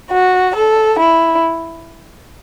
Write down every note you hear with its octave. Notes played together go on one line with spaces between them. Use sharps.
F#4
A4
E4